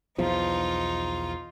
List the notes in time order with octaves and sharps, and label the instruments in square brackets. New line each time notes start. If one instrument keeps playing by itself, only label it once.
[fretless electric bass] B1 E2 F3 [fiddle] D#4 F4